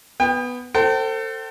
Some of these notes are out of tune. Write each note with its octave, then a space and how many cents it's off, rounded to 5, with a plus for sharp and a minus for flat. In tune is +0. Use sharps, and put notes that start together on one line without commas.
B3 +0 G5 +40
A4 +30 C5 +10 G5 -35